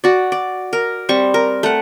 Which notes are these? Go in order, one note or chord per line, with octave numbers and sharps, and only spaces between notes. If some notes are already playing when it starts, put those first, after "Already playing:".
F#4 D5
D5
A#4
G3 C4 C#6
A#4
A3 F#5